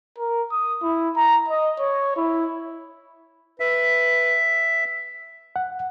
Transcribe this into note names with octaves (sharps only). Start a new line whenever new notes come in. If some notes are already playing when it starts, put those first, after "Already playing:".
A#4
D#6
E4
A#5
D#5
C#5
E4
B4 E5
F#5